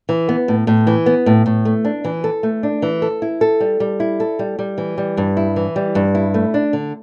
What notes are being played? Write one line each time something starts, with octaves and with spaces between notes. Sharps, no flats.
E3
B3
A2
A2
E3
B3
A2
A2
A3
D4
E3
A4
A3
D4
E3
A4
E4
A4
G3
G3
E4
A4
G3
G3
E3
G3
G2
E4
E3
G3
G2
E4
A3
D4
D3